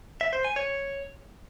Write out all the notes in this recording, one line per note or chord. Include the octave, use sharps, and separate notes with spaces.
E5
C5
G#5
C#5